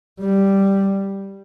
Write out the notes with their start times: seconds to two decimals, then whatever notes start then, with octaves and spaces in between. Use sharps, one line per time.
0.19 G3